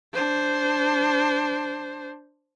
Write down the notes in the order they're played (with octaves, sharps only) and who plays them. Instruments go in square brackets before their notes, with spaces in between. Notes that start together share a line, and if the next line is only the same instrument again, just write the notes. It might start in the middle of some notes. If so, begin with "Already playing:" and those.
[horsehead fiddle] D4 C5